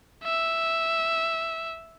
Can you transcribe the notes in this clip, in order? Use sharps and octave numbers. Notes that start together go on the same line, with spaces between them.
E5